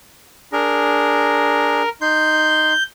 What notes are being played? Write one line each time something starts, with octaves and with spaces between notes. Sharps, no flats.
D4 G#4 A#4
D#4 C6 G6